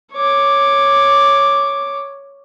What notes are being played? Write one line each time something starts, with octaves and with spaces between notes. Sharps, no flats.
C#5 D6